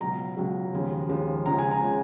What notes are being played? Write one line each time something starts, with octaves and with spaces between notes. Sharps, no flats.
C#2 B2 F#3 A#5
C#2 B2 F#3
D#2 C#3 F3 G#3
D#2 C#3 F3 G#3
C#2 C#3 F3 G#3 A#5
G#5
A#5
C#3 F3 G#3